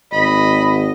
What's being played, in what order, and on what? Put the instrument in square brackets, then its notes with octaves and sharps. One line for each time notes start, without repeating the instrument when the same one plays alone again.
[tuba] G#1 [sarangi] D#5 [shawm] B5